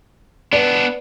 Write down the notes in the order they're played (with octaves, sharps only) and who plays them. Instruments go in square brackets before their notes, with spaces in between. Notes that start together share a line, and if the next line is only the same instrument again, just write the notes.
[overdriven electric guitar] B3 D4 [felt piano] B4 D5